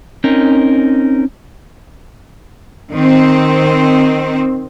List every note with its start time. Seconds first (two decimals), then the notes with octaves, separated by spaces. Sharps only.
0.24 C4 C#4 D#4 A#4
2.92 D#3 C4